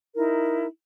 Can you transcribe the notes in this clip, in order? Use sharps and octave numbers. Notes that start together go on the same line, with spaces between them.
D#4 E4 A#4